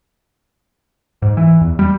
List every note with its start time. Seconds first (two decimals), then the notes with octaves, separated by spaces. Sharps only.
1.22 G#2
1.37 E3
1.61 E2
1.79 G3